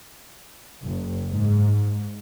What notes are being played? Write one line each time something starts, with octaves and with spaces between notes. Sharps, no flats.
F#1
G#2